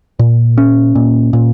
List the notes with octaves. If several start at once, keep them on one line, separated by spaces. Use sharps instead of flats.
A#2
C#4
A#2
A#2